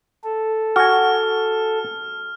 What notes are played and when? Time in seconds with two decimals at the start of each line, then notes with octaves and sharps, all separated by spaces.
0.24 A4
0.76 F#4 G#5 F6